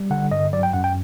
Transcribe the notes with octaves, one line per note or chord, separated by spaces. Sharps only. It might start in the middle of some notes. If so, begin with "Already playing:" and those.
Already playing: G3
D3 F#5
G2 D#5
F#3 D5
G5
F#2 F#5
G5